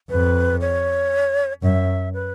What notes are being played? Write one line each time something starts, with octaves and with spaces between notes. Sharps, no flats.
F2 B4
C#5
F#2 E5
B4